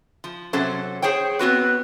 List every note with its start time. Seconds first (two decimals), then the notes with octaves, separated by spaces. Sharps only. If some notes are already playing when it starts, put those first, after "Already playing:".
0.24 F3
0.53 C3 F#3 C#4 A4 C5
1.02 G#4 C5 C#5 G5
1.39 B3 C4 F#4 B4